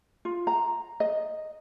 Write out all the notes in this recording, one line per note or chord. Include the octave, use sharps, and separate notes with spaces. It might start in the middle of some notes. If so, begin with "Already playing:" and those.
F4
A#5
D#5